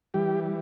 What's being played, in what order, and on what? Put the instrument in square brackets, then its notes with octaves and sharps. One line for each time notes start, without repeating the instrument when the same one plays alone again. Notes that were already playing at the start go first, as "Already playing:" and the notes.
[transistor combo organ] E3 G3 G4